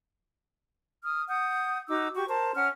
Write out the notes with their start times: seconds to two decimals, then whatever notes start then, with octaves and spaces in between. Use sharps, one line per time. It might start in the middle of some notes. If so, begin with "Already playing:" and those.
1.03 D#6 F6
1.29 F#5 D#6 G6
1.88 D#4 F#4 D6 E6
2.15 F#4 G4 C#6
2.27 A#4 C5 A5
2.56 C#4 F#5 F6